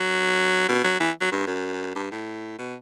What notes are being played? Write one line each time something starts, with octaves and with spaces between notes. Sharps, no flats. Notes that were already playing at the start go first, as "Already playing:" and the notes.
Already playing: F#3
B2
F#3
E3
F#3
G2
F#2
G2
A2
B2